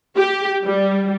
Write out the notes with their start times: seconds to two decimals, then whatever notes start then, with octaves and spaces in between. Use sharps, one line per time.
0.17 G4
0.64 G3